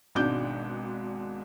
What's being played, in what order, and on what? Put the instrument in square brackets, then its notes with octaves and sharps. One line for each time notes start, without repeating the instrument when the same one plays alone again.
[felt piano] G#1 G#2 B2 D4 D6 G6